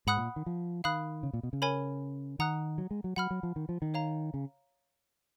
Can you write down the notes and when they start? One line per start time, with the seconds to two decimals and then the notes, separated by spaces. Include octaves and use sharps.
0.07 G#2 F#5 B5 D#6 F#6
0.17 A#2
0.36 D#3
0.46 F3
0.84 D#3 F5 B5 D#6 F#6
1.23 C#3
1.33 A#2
1.43 B2
1.53 C#3
1.62 A#4 C#5 G#5 B5
2.39 D#3 F#5 A#5 D#6 F#6
2.78 F#3
2.91 G#3
3.04 F#3
3.16 F#3 F#5 B5 F6
3.31 F#3
3.43 F3
3.56 D#3
3.69 F3
3.82 D#3
3.94 C#5 F5 A#5
4.34 C#3